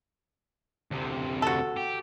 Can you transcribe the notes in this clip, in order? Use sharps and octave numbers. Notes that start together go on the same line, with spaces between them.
D2 C3
F#4 A4
G4